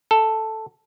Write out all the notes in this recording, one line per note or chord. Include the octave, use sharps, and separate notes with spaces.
A4